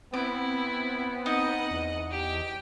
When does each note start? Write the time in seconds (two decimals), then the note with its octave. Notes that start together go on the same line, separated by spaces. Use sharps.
0.14 B3 C4 E4 D6
1.26 D#4 D#5 F#5
1.71 E2
2.10 G4 G5